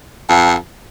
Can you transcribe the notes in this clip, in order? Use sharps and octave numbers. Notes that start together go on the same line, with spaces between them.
F2